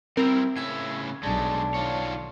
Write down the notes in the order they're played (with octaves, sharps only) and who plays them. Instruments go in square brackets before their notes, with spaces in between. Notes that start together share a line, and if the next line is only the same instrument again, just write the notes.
[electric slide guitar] G3 E4 [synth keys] C4 A#4
[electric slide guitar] A2 C#3 E5 [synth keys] G#6
[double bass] B1 D4 [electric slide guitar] G#3 A3
[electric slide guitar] D#3 F4 C#5